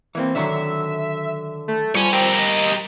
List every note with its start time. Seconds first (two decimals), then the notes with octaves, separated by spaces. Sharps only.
0.15 E3 A#3 C4
0.35 D3 D#3 F#3 E5
1.68 A3
1.95 F3 G3 C#5 G#5
2.13 C4 G4 A#4
2.37 D#5